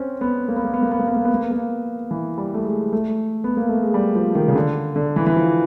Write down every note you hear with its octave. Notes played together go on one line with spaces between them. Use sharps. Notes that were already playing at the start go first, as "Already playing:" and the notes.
Already playing: C4 C#4
B3
A#3
B3
A#3
B3
A#3
B3
A#3
B3
A#3
B3
A#3
B3
A#3
E3
G3
A3
G#3
A3
B3
A#3
A3
G#3
G3
F3
D#3
C#3
D3
D3
E3
E3
F3